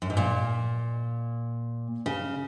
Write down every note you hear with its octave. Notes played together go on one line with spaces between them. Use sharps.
F#2
G#2
A#2
C#3